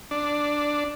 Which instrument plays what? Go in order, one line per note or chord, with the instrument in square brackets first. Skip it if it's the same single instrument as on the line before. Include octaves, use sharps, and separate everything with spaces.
[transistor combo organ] D4